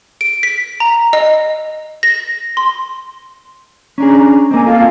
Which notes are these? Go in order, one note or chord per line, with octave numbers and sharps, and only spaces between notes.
D7
B6
A#5
D#5
A#6
C6
C#4 D4 G#4 A#5
A#3 C4 D#5 G#5 A#5
F4 A4 F5